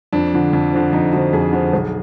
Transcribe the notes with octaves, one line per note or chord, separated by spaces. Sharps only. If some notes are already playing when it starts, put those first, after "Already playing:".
F2 D4
D3 F3
F2
D3 F3
F2 D#4
D3 F3 F#4
F2 G#4
D3 F3
B1